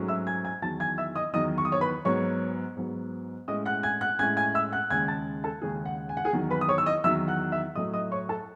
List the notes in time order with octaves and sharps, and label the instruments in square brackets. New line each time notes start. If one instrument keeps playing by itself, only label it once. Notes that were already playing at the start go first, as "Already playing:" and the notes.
Already playing: [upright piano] G#2 F#3 A3 C#4
E5 E6
G#5 G#6
G#5 G#6
E2 D#3 F#3 A5 A6
G#5 G#6
E5 E6
D#5 D#6
E2 D#3 F#3 D#5 D#6
C#6
D#6
C#5 C#6
B4 B5
G#2 F#3 B3 C#5 C#6
G#2 F#3 B3
A2 G#3 C#4 D#5 D#6
F#5 F#6
G#5 G#6
F#5 F#6
A2 G#3 C#4 G#5 G#6
G#5 G#6
E5 E6
F#5 F#6
D#2 C#3 G#3 C#4 G#5 G#6
A5 A6
A4 A5
D#2 C#3 G#3 C#4 G#4 G#5
F#5
G#5
F#5
G#4 G#5
E2 D#3 F#3
B4 B5
D#6
C#5 C#6
E6
D#5 D#6
E2 D#3 F#3 E5 E6
F#5 F#6
E5 E6
A2 F#3 A3 D#5 D#6
D#5 D#6
C#5 C#6
A4 A5